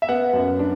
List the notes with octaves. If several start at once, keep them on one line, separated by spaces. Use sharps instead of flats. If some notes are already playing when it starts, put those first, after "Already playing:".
E5
B3 F#5
F#2
D4